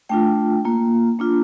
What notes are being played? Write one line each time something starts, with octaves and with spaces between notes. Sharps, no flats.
A3 D4 F4 G5
A#3 F4
A#3 D4 F4